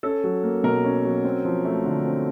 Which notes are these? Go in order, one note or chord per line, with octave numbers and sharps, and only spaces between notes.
C#4 A4
F#3
A#3
B2 A#4
C#4
F#3
C4
F3
A3
D3
C4